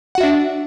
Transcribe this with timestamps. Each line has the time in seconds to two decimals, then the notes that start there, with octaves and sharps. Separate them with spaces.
0.15 F#5
0.18 F#4
0.20 E5
0.23 D4